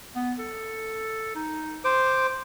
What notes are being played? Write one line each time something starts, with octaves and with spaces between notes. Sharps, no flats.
B3
A4
D#4
C5 D6